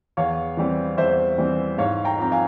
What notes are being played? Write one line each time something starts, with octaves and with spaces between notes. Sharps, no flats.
E2 C#5 F5
E3 G3 C4
E2 C5 E5
E3 G3 C4
G#2 C#5 F5
G5 A#5
F3 C4 A#5
F5 G#5